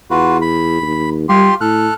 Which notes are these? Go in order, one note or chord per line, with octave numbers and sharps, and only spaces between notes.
E2 F4 F#4 B4
B5
D#2
G3 F4 G4 C6
A2 A4 F6 F#6